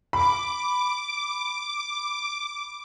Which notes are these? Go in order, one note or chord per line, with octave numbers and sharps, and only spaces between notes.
B5 D6